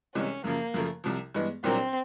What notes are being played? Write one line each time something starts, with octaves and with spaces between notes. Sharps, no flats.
C2 C3 E3 G#3 C#4
F#2 C#3 F3 A#3
F#2 C#3 F3 A3
C2 C3 F3
G2 E3 G#3 B3
C2 A#2 F#3 A#3 C4 D4